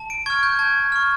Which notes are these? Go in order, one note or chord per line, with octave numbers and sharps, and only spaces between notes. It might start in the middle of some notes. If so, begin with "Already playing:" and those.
Already playing: A5
D7
C#6 F6 G#6
G6
A5 G#6
C#6 F6